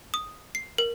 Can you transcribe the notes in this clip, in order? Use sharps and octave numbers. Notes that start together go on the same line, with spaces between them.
D#6
C7
A#4